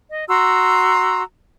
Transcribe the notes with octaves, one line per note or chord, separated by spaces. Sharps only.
D#5
F#4 A#5 C6 E6